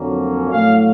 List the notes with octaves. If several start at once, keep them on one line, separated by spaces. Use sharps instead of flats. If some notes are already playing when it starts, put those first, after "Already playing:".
Already playing: F2 D3 F#3 A#3 C#4
A2 F#3 A3 F5